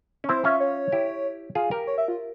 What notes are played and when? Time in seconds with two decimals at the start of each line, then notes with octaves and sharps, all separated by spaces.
0.24 C#4
0.29 C4 E4 C5
0.44 C#4 F4 E5
0.60 C#5
0.92 E4 G4
1.55 F4 G#4
1.71 G4 A#4
1.87 C#5
1.98 E5
2.08 F4